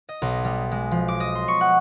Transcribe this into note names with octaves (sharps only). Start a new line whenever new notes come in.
D#5
B1
G3
G#3
F3
D6
D#5
C6
C#6
F#5